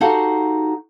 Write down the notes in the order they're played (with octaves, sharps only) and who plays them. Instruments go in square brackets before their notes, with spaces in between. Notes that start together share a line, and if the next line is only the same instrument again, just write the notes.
[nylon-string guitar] D#4 F#4 G4 A4 F5 F#5